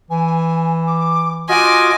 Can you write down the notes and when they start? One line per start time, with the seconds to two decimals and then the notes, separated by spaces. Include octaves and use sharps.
0.10 E3 G#5
0.87 D6
1.49 F4 F#4 D#5 G#5 D6